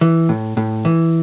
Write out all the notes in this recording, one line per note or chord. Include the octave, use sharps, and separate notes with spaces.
E3
A2
A2
E3